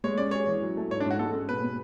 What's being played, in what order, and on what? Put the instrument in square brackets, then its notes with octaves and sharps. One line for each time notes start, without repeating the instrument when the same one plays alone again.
[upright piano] G#3 [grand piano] C#5
[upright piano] C#4 [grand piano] D5
[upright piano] G#4 [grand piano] C#5
[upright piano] E3
F#3
A3
[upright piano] G#2 [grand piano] C#5
[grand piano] D4
[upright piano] G#2
[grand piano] F#4
[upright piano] G#3 [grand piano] A4
[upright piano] C#4
[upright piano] B2 [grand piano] B4
[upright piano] B2